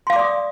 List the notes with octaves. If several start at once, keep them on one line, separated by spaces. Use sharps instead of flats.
D5 F5 C6 D6 D#6